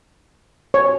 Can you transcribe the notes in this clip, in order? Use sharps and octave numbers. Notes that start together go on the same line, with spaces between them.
C#5